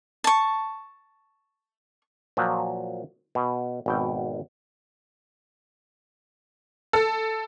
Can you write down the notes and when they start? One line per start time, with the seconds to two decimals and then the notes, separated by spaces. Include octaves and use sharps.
0.24 A5 C#6
2.37 A#2 F3 F#3
3.35 B2
3.86 G#1 B2 G5
6.93 A4